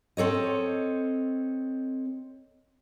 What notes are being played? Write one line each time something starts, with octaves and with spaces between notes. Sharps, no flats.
C4 A4 C#5 D#5